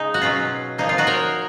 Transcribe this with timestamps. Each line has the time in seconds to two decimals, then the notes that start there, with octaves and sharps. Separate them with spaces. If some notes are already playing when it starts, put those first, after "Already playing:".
Already playing: C#3 G#3 D#4
0.14 F#4
0.21 B2 F#3 C#4 F4
0.78 A#2 F3 A#3 D#4
0.89 F4
0.98 D#4 F#4
1.07 A#4 C#5